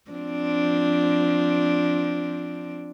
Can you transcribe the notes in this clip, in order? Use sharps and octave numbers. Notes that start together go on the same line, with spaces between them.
F3 C4 D4